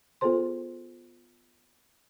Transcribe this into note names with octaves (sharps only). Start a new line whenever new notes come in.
B3 F4 G#4 A4 C5 C6